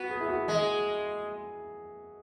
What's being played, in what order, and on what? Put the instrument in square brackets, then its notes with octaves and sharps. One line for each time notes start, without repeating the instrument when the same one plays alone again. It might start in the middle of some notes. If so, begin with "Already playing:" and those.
Already playing: [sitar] B3 [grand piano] F#4
[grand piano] G#4
E4
F#4
[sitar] G#3 [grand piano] G#4